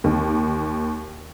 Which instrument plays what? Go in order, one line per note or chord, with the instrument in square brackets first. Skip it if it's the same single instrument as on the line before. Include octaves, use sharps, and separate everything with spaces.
[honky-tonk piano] D#2